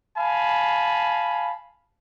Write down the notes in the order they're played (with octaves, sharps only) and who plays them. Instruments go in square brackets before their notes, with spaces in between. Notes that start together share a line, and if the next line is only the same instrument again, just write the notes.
[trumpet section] F5 G#5 A5 B5